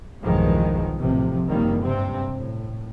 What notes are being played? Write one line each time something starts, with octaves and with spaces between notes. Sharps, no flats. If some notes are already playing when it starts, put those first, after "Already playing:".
B1 E2 G2 D#3 F3 G#3
A1 C3 F3
F#1 C#2 D#3 G3 A#3
G2 C3 C4
A2